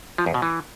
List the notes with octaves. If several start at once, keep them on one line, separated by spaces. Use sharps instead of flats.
F3
E2
B2
E3